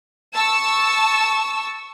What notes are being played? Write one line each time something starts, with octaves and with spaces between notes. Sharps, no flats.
A5 C#6 E6